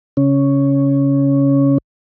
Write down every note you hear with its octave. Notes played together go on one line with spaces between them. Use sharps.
C#3 C#4